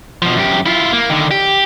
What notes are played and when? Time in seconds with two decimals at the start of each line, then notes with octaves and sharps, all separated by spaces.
0.22 B2 F3
0.37 F#2 G4
0.66 E4 F4
0.93 A#3
1.10 D3 D#3
1.31 G4